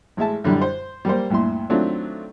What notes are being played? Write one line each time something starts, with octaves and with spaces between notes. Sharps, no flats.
A1 G#3 E5 A5
F#2 D3 E3 G3
C5
G3 A#3 C5
D2 G2 A#2 E4 C6
D#3 F#3 A3 C4 D4 F4